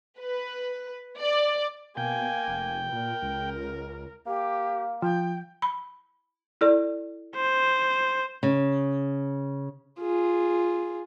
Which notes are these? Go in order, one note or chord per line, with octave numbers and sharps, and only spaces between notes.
B4
D5
B2 A#3 G5 G#5
F1
A#2 A#4
C#2
A#3 G4
F3 G5
B5
E4 A4 D5
C5
C#3
F4 G#4